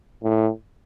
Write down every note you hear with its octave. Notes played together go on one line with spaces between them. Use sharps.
A2